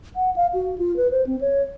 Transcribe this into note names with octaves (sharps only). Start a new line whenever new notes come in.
F#5
F5
F#4
F4
B4
C5
C4
C#5